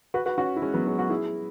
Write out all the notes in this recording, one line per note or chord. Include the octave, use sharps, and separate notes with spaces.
F#4 B4
F#4 B4
C#4 F#4
E4
G#3 C#4
F#3 B3
G#3 C#4
C#4 F#4
E4 G#4